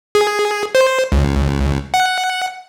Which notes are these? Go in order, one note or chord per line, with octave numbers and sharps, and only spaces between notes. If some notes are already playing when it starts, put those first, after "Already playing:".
G#4
C5
C#2
F#5